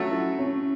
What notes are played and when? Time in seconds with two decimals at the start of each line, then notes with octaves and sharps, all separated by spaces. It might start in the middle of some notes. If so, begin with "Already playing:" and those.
Already playing: F#3 A3 C#4
0.11 E4
0.39 C#4